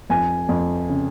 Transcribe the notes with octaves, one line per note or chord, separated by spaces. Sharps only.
F2 G#5
F2
C#3